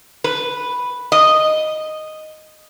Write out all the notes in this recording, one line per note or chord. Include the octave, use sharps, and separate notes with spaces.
B4
D#5